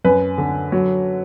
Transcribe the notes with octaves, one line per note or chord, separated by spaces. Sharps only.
F#2 B4
D3
F#3